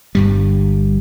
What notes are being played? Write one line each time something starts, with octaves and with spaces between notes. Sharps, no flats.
G1 G2 G3